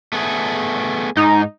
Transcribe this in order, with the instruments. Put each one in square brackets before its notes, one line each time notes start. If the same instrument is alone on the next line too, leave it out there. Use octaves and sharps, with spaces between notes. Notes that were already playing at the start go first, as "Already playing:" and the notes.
[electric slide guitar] A3 B3 G#4
[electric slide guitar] G#2 [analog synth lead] D#4